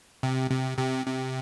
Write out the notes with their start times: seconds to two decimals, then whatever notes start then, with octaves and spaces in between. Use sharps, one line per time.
0.23 C3
0.51 C3
0.78 C3
1.06 C3